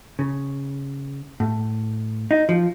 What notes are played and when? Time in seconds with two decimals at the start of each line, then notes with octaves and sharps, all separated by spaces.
0.19 C#3
1.40 A2
2.31 D#4
2.49 F3